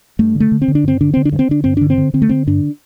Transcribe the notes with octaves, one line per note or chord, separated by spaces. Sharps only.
G2 A3
D3
A3
D3
C4
D3
D4
G2 C4
D3 D4
D3 C4
D4
G2
C4
D3 D4
G2 C4
D3 D4
C4
D3
D3 C4
A3
D3 C4
G2 D4